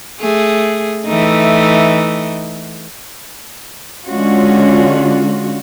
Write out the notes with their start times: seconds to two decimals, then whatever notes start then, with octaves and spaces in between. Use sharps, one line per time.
0.20 A3 G#4
1.07 E3 A3 D#4
4.06 D3 G#3 C#4 F4 F#4